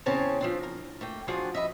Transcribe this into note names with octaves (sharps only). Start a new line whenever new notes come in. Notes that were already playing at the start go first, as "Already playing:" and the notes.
E2 C#3 C4 C#5 G#5 A5
F3 C4 D4
A#4
A3 A#3 G5
F3 D4 F4 F#4 G#4
B4 D#5 E5